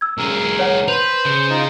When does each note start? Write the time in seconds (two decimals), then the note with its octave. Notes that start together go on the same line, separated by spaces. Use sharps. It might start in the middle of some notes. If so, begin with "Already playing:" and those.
0.01 E6 G#6
0.18 C2 G#4 A#4
0.59 C#5 F#5
0.88 B4 C5 F7
1.25 C#3
1.50 D#4 F4 D#5